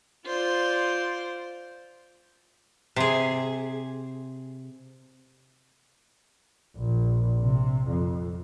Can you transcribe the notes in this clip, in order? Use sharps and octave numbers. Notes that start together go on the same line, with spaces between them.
F4 C5 D5
C3 G#4
A#1
C3
F2